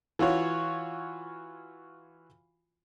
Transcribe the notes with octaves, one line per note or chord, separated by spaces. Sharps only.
E3 F4 F#4 C#5